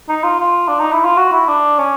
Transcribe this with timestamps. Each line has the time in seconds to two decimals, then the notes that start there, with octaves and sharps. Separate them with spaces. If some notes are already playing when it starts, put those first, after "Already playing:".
0.09 D#4
0.23 F4
0.40 F4
0.68 D4
0.80 D#4
0.92 E4
1.04 F4
1.17 F#4
1.32 E4
1.48 D4
1.79 C#4